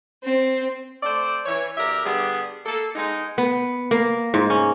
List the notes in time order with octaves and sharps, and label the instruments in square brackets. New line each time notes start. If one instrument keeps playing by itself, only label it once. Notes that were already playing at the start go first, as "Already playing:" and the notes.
[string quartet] C4
[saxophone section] A3 C4 C5 D5
E3 C#5
D2 G4 A#4 D5 E5
D3 G3 B3 D4 G#4
A#3 A4
G#3 B3 D#4
[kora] B3
A#3
G#2
C#4